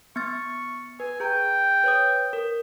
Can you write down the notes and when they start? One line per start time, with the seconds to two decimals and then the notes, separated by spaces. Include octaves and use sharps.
0.16 B3 C#6 F6 A6
1.00 B4 G#5
1.20 G#4 G5 A#5
1.84 B4 C#5 D#6
2.33 A#4